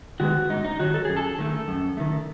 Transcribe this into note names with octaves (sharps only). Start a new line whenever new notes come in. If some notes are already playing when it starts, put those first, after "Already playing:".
D#3 G#3 B3 F#4
G#2 D#4
D#4
D#3 F#3 F#4
A4
F#2 G#4
A4
D#3 A3
F#2
D#3 A3